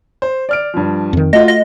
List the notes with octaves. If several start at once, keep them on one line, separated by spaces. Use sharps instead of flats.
C5
D5 F6 D7
G2 F3
F2 D#3
A3 F4 F#4 D#5
D#5